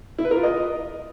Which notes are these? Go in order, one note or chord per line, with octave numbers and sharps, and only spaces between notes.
E4
B4
A#4
F4
D#5